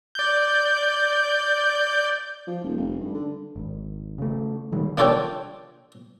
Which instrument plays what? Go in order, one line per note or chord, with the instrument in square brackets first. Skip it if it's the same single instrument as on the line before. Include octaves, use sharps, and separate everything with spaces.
[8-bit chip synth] D5 G6
[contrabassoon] F3
D#1
F1
G2
D3
[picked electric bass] G#1
C#3 A3
A#2 D#3 G3 G#3
[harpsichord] A#3 D4 F4 A4 C#5 G5